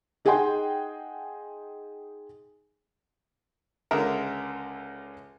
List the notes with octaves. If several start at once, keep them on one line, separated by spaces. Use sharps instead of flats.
D#4 G#4 D#5 F#5 G5 C6
C#2 D3 G#3 A#4 E5